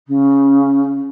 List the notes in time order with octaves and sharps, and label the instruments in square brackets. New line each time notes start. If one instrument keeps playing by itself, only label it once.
[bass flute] C#3